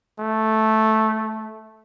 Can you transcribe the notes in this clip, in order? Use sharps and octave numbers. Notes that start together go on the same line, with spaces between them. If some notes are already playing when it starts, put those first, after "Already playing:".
A3